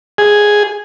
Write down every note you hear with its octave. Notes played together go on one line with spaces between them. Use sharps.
G#4